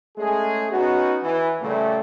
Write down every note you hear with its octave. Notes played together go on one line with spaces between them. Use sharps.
G#3 A3 C#4 G#4
B3 C#4 D#4 F#4
E3
A#2 C#3 G3 A3